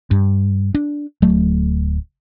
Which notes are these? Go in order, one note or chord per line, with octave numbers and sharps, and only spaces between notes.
G2
D4
D1 F#3 A3